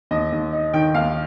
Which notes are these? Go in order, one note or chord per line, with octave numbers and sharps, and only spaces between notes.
D#2 D#5
D#2
D#4
D#3 G5
D#2 F5